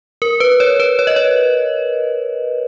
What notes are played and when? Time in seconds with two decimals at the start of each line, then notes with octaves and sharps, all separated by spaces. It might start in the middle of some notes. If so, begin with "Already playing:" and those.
0.22 A#4
0.40 B4
0.60 C#5
0.80 B4
0.99 C#5
1.07 D#5
1.16 C#5